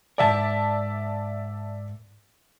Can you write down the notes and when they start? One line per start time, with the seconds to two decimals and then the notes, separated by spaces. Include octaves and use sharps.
0.18 G#2 D#3 A#4 D5 E5 A5